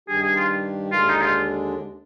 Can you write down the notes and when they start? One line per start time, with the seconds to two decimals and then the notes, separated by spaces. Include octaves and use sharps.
0.09 G2 D#3 G3 D4 G4 G#4
0.22 G#4
0.36 F4
0.92 D#2 D3 G#3 D4 F4
1.09 D#4
1.22 F4